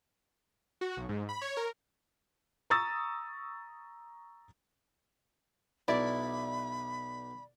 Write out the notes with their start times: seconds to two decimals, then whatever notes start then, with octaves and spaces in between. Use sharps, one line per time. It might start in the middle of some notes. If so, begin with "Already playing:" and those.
0.81 F#4
0.97 B1
1.09 G#2
1.29 B5
1.41 C#5
1.57 A#4
2.70 A#5 C#6 D#6 E6 A6
5.88 B1 E4 D5 B5